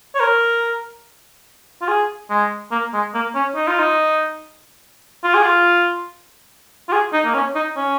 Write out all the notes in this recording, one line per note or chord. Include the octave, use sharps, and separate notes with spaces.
C#5
A#4
F4
G#4
G#3
A#3
G#3
A#3
C#4
D#4
F4
D#4
F4
G#4
F4
F4
G#4
D#4
A#3
C#4
D#4
C#4